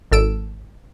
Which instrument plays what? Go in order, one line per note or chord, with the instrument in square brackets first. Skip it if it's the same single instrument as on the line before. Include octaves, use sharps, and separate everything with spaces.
[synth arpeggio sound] G#1 A4 E6 D7